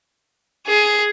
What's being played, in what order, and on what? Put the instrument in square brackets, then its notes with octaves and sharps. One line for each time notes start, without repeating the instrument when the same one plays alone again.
[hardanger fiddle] G#4